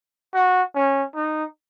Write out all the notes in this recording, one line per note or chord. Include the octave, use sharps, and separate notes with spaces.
F#4
C#4
D#4